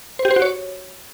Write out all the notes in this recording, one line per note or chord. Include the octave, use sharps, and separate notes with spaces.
C5
G4
C5
F#4
C#5